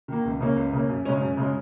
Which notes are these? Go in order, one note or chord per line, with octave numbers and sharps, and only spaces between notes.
D#3 A#3
C#2
C#3 A#3 C#4
C#2
C#3 A#3 C#4
F#2
C#3 G#3 C#4
F#2
C#3 G#3 C#4